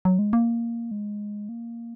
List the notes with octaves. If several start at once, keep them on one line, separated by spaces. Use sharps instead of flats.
F#3
G#3
A#3
G#3
A#3